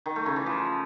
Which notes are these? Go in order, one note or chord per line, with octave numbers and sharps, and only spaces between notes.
D#3
A3
C#3
E3
F3